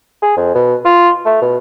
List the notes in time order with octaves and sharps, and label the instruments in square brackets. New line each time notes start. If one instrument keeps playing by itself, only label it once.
[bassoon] G#4
F2
B2
F4
A3
B2